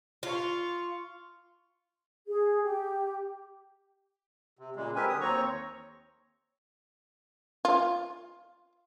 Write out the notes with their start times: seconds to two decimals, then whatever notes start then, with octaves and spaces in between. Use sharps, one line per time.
0.23 F4 F5 C#6
2.27 G#4
2.63 G4
4.59 C3
4.76 A#2 C#3 G#3
4.96 C4 G4 A#4 B4 G#5
5.09 D3 F#3 D#6
5.21 D#2 C4 C#5 A#5 C#6
7.65 F4